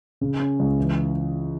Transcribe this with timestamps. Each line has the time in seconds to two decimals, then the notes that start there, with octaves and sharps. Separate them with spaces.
0.21 C#3
0.40 C#4
0.59 C#2
0.78 E3